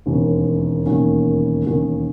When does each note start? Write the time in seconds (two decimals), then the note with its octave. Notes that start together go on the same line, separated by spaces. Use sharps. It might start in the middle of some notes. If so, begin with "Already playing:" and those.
0.06 E1 D#2 D#3 A#3 C#4
0.86 E1 D#2 D#3 A#3 C#4
1.64 E1 D#2 D#3 A#3 C#4